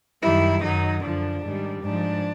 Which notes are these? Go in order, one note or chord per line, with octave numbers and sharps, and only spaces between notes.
F#2 D#3 G3 E4
F#2 D#3 F#3 D#4
F#2 D3 F3 D4
G#2 D#3 G3
G#2 F3 D4